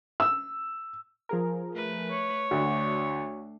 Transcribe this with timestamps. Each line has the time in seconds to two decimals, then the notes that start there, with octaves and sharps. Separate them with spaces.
0.20 E6
1.29 F3 G#4 A#4
1.73 A3 B4
2.11 C#5
2.51 D2 A3 D4 F#4